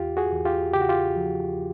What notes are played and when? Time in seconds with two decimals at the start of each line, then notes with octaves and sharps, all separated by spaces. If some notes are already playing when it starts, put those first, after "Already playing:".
Already playing: E2 F4 G4
0.17 F#4 G#4
0.32 E2
0.45 F4 G4
0.73 C#3 G4
0.81 F#4
0.89 F4 G4
1.16 F3